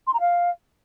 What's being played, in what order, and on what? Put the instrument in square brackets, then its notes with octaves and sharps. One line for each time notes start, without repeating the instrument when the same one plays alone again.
[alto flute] C6
A#5
F5